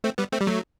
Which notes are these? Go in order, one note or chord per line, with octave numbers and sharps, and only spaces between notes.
A3 C4
G3 B3
A3 C4
G3
F#3 A3